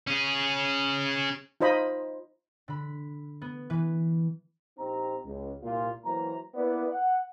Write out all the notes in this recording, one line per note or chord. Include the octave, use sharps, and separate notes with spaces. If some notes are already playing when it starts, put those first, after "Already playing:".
C#4 G#4
D#4 F4 C5 D#5 B5
D3 B5
B3
E3 B4
A#1 C4 D#4 G4 A#5
C#2
C2 A#2 F4
E3 F#3 A#3 C5 A#5
A#3 B3 E4 B4 D5
F#5